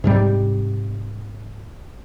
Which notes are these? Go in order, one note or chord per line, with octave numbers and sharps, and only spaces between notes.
G#2 C3 G3